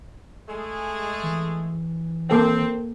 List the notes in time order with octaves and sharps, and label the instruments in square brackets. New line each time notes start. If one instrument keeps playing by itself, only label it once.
[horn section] G#3 A3 G#4
[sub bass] E3
[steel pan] A#3 A4 G5 [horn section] C4